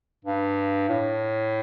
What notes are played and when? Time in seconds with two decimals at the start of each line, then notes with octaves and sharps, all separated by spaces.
0.25 G2
0.89 A2